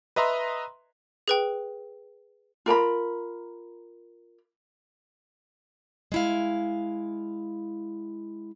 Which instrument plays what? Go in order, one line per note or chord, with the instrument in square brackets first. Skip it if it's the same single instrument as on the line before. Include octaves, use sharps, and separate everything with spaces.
[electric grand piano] B4 D#5 E5 A#5 C6
[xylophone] G#4 B4 G5
[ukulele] F4 A#4 A#5 B5
[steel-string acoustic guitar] G#3 E4 F5